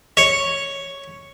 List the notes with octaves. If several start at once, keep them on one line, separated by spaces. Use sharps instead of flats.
C#5